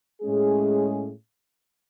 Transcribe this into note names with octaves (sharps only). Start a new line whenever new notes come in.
A2 G#3 C#4 G#4